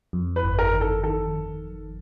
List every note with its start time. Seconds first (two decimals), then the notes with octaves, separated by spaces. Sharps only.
0.13 F2
0.36 B4
0.43 G1
0.59 A#4
0.73 D#3
0.81 A4
1.03 D#3 A4